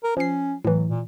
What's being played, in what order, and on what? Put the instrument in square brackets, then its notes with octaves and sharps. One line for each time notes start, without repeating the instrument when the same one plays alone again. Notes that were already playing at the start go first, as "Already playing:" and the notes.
[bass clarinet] A#4
[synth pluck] F3 C7 [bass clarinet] C#4
[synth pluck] A2 E3 [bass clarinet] F#3
[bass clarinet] A#2